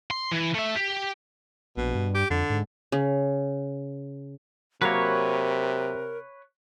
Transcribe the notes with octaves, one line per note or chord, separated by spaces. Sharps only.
C6
E3
A3 E5
G4
A#1 B2
G2
G4
F2 D3
G#2
C#3
C3 F#3 A#3 A#4 B4 C#5